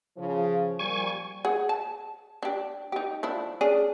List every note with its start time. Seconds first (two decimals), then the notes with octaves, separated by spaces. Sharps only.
0.17 C#3 F3
0.79 A#2 F3 G3 G#5 C#6
1.45 G#4 F#5
1.69 A5
2.43 D4 G4
2.92 D#4 G4
3.23 F3 D4 E4
3.61 C#4 D4 G#4